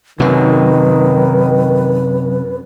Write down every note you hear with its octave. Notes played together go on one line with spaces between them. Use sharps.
F#2 C3 D#3 F#3 B4